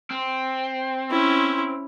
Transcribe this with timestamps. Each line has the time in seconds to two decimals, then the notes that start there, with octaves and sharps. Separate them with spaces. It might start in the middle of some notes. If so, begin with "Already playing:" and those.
0.11 C4
1.11 C#4 E4